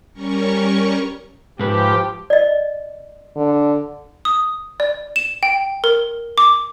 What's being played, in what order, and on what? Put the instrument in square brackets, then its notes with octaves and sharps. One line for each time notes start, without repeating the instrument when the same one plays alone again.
[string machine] G3 C#4 A#4 C#6
[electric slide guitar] G#2 B4 [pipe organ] F3 G4
[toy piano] D5 D#5
[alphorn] D3
[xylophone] D#6
D5
E7
G5
A#4
D6